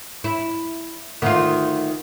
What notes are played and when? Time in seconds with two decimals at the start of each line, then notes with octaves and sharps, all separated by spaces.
0.24 E4
1.22 D2 D#3 F4